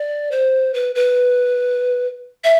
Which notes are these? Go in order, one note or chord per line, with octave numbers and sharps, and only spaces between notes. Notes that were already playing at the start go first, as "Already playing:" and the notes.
Already playing: D5
C5
B4
B4
E5